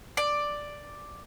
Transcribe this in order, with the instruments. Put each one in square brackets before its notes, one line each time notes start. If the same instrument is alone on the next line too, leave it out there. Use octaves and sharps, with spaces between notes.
[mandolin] D5